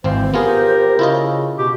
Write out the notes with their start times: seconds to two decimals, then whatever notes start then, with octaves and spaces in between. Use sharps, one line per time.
0.04 G#1 E3 C4 C5 F5
0.34 B3 F4 G4 G#4 A#4
0.99 C#3 E4 F4 D#5
1.58 B2 G4